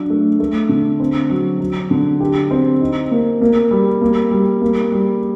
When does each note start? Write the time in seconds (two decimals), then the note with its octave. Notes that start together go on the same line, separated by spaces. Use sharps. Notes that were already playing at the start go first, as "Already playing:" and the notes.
Already playing: F#3 D4
0.10 A3
0.40 A3
0.69 D3
1.00 C4
1.30 F#3
1.60 F#3
1.91 D3
2.20 G4
2.51 C4
2.81 D#4
3.11 A#3
3.41 A#3
3.71 G3
4.01 A#3
4.31 G3
4.61 A#3
4.92 G3